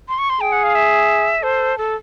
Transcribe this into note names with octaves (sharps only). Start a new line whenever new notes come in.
C6
C#6
C6
G#4 G5
F#5
F5
E5
A4 C5
A4